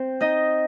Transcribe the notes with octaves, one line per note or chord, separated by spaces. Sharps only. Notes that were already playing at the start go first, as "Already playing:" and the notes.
Already playing: C4 C5
D#4 D#5